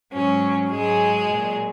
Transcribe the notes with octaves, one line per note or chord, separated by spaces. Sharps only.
G#2 F#3 C#4
G#2 F#3 G#3 G#4
A#2 F#3